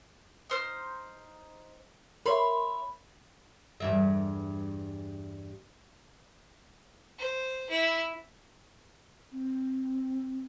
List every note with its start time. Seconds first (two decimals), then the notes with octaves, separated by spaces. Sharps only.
0.50 D#4 C5 F6
2.26 A#4 C#5 E5 B5 C6
3.80 E2 G2 E5
7.18 C5
7.69 E4
9.32 C4